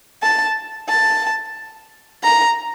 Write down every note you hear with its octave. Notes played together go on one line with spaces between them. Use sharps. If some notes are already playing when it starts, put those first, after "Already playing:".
A5
A5
A#5